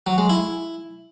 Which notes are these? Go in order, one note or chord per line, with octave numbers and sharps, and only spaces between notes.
F#3
G#3
E4